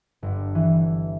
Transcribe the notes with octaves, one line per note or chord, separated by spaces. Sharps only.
G1
E3